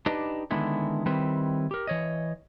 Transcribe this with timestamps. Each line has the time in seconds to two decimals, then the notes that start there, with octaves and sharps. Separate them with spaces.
0.06 D4 D#4 G4 B4 D#5
0.51 D3 D#3 G#3 B3 E4
1.06 D#3 G3 C4 E4 B4
1.71 G4 A#4
1.87 E3 C#5 D#5